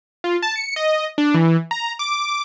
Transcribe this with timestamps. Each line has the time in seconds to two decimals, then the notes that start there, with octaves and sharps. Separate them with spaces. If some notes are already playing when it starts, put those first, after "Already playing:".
0.24 F4
0.42 A5
0.56 C#7
0.76 D#5
1.18 D4
1.34 E3
1.71 A#5
1.99 D6